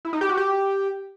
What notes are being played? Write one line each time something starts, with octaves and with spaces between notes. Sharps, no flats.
E4
D#4
G4
F#4
G4